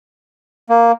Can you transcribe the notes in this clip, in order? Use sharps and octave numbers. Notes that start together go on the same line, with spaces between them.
A#3